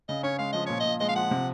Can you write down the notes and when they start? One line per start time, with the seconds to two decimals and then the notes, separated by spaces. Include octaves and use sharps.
0.08 C#3 D#5
0.23 C#4 C#5
0.38 G#3 F5
0.52 F3 D#5
0.66 A#2 C#5
0.80 A#2 D#5
1.00 G#3 D#5
1.09 F5
1.15 F3 F#5
1.31 C3